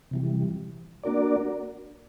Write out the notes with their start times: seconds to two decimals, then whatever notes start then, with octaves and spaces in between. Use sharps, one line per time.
0.11 C3 E3 G3
1.03 A#3 D4 F#4 A#4 D5